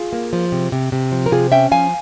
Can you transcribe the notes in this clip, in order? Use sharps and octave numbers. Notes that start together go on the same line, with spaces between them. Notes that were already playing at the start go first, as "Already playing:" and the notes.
Already playing: F4 G#4
A#3
F3
C3
C3
C3
F3
A#4
C3 F4 G#4
C#4 E5 G5
F3 F5 G#5